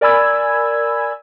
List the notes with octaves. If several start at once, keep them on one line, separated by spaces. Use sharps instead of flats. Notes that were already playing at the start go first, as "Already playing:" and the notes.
A#4 D5 G#5 B5 E6 G#6